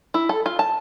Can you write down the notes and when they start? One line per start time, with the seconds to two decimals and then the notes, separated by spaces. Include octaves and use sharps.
0.14 E4
0.29 A4
0.46 F4
0.59 A5